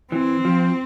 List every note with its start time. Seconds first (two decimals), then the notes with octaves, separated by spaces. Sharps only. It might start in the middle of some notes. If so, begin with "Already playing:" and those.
0.11 E3 C4
0.45 F3